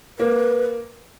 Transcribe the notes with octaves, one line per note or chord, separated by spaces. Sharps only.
A#3 B4